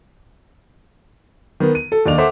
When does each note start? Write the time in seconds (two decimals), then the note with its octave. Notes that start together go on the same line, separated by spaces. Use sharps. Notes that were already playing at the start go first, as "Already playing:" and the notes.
1.60 D#3 B3
1.75 D#7
1.92 A4
2.06 D#2 D4 D5 D#5 F7
2.18 A4 C5 E5 F#5 D6